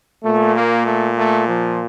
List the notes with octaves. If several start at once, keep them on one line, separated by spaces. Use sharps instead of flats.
A#2 A3
A#3
A3
A3
F3